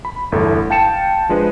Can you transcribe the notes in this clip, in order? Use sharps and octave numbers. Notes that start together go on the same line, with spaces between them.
B5
G1 E2 A2 E4 A4
F5 G5 A5 C#7 E7
F3 G#3 D4 B4 D#5